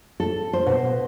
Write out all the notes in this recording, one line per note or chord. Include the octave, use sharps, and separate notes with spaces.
A4
C5
B2